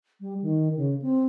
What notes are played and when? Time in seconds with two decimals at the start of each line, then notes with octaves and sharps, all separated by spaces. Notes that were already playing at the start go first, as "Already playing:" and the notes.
0.21 G3
0.42 D#3
0.76 C#3
1.02 C4